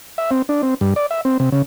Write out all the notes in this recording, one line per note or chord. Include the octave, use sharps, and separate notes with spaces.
E5
C4
D4
C4
G2
D5
E5
C4
C3
C#3